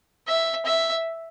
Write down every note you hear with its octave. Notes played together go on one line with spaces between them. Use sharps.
E5
E5